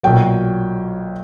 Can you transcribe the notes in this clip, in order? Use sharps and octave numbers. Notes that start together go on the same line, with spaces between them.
B1 A#2 F#3 G5